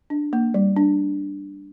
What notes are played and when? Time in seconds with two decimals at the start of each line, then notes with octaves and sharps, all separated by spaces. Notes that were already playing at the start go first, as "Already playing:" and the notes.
0.10 D4
0.33 A#3
0.54 G3
0.76 D4